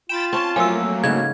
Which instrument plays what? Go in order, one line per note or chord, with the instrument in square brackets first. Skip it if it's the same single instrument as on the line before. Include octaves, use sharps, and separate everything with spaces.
[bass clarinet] F4 [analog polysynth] G5 B5 A6 [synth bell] E7
[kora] C4 C#4 [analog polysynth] A5
[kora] F3 [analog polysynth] F#3 A3 A#3 [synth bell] G#5 E6
[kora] G#2 C#3 [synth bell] G#6